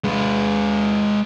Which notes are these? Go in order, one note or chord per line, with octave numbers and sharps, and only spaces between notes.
G#3 B4